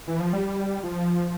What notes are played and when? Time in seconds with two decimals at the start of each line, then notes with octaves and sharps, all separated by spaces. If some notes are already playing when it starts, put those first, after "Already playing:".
0.08 E3
0.20 F3
0.33 G3
0.83 F3